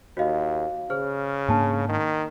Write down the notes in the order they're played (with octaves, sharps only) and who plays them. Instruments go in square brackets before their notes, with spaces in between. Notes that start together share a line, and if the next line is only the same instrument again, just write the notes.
[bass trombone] D#2 [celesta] F#4 F5 [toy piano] C#5 D#5
[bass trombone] C#3 [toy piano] G#4 C5 [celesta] F6
[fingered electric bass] G#2 A#3 D4 [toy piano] G#5 A5
[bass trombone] D#3